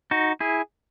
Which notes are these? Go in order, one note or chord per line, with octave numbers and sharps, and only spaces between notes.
D#4 F#4
E4 G#4